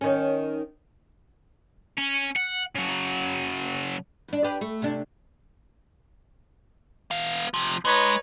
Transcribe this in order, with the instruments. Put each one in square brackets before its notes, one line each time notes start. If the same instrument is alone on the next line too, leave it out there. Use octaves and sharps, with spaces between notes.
[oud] D#3 C#4
[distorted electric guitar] C#4
F#5
C#3 F#3
[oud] E2 D4
D4 G4 B4
A3
C3 D4
[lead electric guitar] B3 F5
C3 F3
[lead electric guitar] G#3 [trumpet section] D#4 B4 C#5